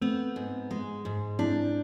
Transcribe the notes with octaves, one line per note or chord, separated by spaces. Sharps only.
A3 B3 C4
G#2
G#3
G#2
C4 D4 E4